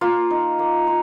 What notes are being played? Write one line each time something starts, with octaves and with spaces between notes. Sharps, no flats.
A#3 F4
D#4
A#3
F4